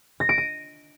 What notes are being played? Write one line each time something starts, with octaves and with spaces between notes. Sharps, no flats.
A#6
D7
D#7